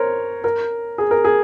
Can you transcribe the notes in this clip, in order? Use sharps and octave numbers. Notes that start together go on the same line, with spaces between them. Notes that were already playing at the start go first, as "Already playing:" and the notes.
Already playing: A#4 C5 C#5
A#4
G#4
A#4
G#4